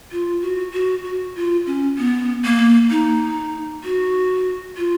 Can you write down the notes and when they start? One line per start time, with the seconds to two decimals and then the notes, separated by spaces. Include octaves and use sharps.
0.12 F4
0.42 F#4
0.74 F#4
1.04 F#4
1.35 F4
1.66 C#4
1.98 B3
2.45 A#3
2.90 D#4
3.84 F#4
4.77 F4